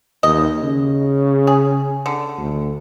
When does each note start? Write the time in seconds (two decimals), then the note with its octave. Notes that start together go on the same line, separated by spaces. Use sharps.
0.23 D#2 D#5
0.62 C#3
1.47 G#4
2.06 D3
2.38 D2